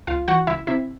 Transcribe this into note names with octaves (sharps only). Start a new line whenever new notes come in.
C#2 F4 F5
E3 F#4 F#5
C#2 E4 E5
C3 E4 E5